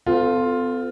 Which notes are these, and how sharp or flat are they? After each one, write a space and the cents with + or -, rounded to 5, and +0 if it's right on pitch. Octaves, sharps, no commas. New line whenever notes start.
C4 -45 F4 +5 A4 +0